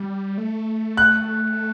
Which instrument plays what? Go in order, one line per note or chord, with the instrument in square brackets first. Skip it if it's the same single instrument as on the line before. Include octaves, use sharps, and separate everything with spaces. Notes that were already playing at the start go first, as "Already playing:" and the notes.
Already playing: [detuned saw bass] G3
A3
[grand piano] F#6